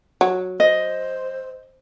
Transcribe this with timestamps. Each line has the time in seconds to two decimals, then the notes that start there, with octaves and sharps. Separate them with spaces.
0.21 F#3
0.60 C5 D#5